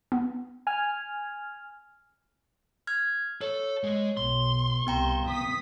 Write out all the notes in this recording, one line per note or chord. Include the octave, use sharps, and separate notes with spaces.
B3
G#5 F6
F6 G#6
A4 C#5
G#3
B1 C6
C2 B3 G5 A#5
D#6 B6